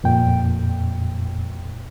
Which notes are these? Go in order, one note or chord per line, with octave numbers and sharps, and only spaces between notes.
F2 A#2 G5